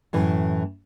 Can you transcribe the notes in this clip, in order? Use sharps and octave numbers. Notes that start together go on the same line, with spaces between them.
F#2 A2 E3